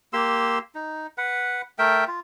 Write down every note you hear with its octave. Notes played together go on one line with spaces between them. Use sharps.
A#3 G4 C6 E6
D#4
B4 F#5
A3 A#4 E5 G5
F4